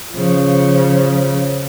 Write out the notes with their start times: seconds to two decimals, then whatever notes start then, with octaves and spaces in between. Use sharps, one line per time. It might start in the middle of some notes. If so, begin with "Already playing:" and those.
0.12 C#3 F3